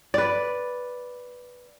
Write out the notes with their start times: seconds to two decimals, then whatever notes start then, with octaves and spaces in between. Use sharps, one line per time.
0.14 B4 D5